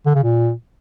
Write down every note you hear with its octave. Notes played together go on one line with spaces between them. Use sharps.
D3
C#3
A#2